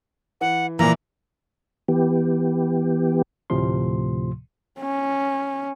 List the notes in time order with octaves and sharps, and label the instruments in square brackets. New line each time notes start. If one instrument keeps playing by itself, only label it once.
[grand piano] E3 [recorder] F#5
[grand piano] A#2 F3 A#3 [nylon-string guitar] E3 [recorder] A#5
[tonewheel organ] E3 B3 G4
[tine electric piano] D2 A2 C3 F3 C6
[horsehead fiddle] C#4